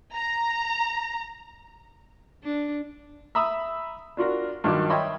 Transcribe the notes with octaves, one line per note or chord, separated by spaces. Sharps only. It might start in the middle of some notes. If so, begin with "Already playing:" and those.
A#5
D4
E5 A#5 B5 D#6 E6
D4 F4 F#4 A#4
G2 D#3 F#3 F4 D6
C#5 D#5 E5 G5 B5 C6